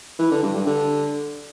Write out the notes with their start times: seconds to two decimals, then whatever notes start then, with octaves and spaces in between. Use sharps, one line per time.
0.19 E3
0.31 D3
0.43 G2
0.55 G2
0.66 D3